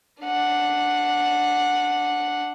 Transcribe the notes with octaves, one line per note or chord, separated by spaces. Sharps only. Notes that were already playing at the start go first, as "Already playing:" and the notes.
D4 F#5